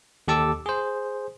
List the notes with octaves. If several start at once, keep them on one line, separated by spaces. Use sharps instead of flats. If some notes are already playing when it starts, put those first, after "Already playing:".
D#2 G4 A4 A5 D6 E6
G#4 C5